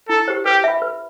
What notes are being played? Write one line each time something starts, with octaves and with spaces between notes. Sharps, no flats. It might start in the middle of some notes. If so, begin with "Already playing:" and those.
E4 A4
G4 C5
G4 B4
E5 B5
B4